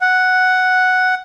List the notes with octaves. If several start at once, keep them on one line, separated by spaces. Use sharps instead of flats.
F#5